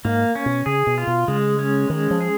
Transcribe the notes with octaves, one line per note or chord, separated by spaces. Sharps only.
G#2 A#3
C#4
B2
C#3 G#4
B2
F4
B2
C#3 G#3
C#4
D#3 G#3
F3
G#4